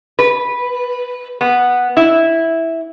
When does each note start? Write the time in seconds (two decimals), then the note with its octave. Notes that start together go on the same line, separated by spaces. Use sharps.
0.19 B4
1.41 B3
1.97 E4